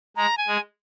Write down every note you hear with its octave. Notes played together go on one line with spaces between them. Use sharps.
G#3 A#5
G#5
G#3